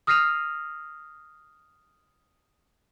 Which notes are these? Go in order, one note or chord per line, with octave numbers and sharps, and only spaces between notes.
D#6 F6 A#6 C7 D#7 F7